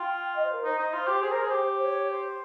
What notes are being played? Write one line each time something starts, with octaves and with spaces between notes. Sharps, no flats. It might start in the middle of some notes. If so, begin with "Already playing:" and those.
Already playing: F4 G5
D#5
C5
A#4
D#4 C5
D#4
F4
G4
G#4
A#4
G#4
G4
C#5
C5